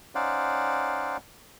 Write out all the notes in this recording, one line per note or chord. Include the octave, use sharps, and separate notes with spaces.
C#4 D#4 C5 D5 F5 F#5